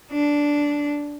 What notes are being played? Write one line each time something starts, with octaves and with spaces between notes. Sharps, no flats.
D4